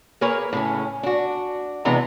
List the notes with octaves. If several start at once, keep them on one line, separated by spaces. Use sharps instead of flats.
A#3 G#4 A#4 B4 C#5
A2 C#3 C#4
D4 F#4
C3 E3 G#3 B3 D4 A#5